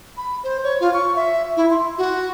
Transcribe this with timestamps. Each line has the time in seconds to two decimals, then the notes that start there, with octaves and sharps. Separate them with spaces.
0.17 B5
0.44 C5
0.64 C#5
0.80 F4
0.94 C#6
1.16 E5
1.57 E4
1.70 C6
1.98 F#4